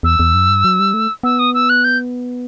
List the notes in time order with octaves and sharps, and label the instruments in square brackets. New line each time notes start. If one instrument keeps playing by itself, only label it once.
[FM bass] E2 [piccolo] E6
[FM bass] E2
F#2
G2
F#3
G3
A3
[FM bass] B3 [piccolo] E6
[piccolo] D#6
E6
F#6
G6